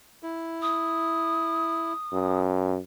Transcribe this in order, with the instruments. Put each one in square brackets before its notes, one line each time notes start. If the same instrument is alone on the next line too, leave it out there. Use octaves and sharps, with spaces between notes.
[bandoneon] E4
[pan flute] D#6
[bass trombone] F#2